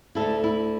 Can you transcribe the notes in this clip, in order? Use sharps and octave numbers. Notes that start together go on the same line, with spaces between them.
D2 D3 A3 E4 A4
E4